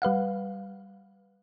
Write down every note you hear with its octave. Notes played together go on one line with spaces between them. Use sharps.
G3 B4 F5 F#5